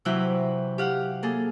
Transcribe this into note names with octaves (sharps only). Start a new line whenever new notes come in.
C3 E3 F#3 E4 G5 F#6
G4 F5 F#5
A#3 G#4 A4